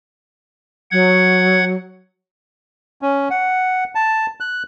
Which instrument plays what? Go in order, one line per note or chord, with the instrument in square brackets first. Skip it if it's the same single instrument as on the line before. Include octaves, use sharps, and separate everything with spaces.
[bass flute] F#3 [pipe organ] F#5 G#6
[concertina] C#4
F#5
A5
F#6